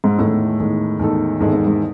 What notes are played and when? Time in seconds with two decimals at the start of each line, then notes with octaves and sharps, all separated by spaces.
0.04 G#2
0.18 E2 A2 D#3 G#3 D#4 A4
0.59 E2 D#3 G#3 D#4 A4
0.99 E2 D#3 G#3 D#4 A4
1.40 E2 G#2 D#3 G#3 D#4 A4
1.53 G#2
1.67 G#2